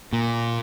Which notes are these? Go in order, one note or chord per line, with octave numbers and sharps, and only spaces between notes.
A#2